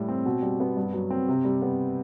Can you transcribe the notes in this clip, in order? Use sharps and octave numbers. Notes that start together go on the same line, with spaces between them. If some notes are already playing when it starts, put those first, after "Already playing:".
Already playing: A2 G3
C4
B2
G3
B3
G2
F#3
C4
C3
G3
B3